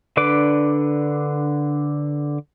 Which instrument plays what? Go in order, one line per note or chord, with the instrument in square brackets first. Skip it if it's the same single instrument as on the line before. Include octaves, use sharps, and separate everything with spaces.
[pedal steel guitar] D3 D4 B4 D6